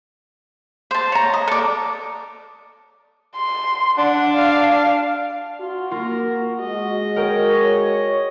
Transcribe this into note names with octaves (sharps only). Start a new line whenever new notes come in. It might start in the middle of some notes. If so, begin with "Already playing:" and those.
C5 A5
C#5 A#5
D#5
A4 D5
C6
D4 F#5
F5
F5
F4 F#4
A#3 F4 A#4
G#3 F#4 D#5
A#4 C#5 G5